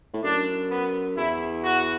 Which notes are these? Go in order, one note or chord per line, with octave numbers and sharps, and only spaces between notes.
A2
F#2 D4
B3
E2 E4
F#4